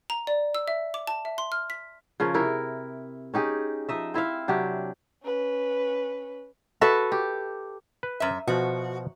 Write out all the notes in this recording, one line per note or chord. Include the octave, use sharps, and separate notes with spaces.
A#5
D5
E6
E5
D6
A5
E5
C6
F6
B6
C#3 F3 C#4 A#4
C3 E4 A#4
C#4 D#4 G4 G#4
F3 D#4 D#5 E5
C4 E4 E5 F5
C3 F#3 D4 G4
C#4 B4
F#4 A4 B4 E5
G4
B4
F#2 E5
B2 F3 F#4